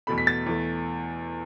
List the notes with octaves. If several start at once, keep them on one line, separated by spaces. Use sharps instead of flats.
E2 B2 A3 B5
B6
A6
E2 E3 A3